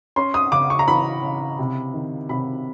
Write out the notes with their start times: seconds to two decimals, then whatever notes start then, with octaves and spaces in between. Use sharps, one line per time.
0.16 C#4 C6
0.34 D#6
0.52 C#3 D6
0.70 C#6
0.79 A#5
0.88 E3 B5
1.22 C#3
1.59 C3
1.94 D#3
2.29 C3 B5